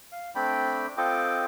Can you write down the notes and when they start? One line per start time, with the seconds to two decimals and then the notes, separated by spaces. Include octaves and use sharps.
0.12 F5
0.35 A3 C4 D4 D5 G5 B5
0.97 C4 F4 A4 D#5 G5 D6